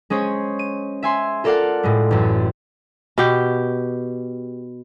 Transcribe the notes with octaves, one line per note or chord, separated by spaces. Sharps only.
G#3 C#4 G#4 C5 C#5
D#7
E5 G#5 C6
F4 A4 A#4 D5 F5 F#5
A2 G#3 A3
A1 F#2
B2 G4